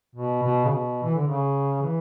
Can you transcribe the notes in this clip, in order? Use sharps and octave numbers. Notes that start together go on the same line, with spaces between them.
B2
B2
C#3
B2
E3
D3
C#3
E3